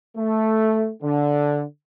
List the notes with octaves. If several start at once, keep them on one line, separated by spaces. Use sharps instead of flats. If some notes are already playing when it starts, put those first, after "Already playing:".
A3
D3